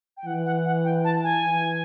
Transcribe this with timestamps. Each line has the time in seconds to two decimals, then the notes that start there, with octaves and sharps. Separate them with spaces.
0.17 G5
0.26 E3 F#5
0.45 F#5
0.66 F#5
0.84 G5
1.04 A5
1.23 G#5
1.43 E3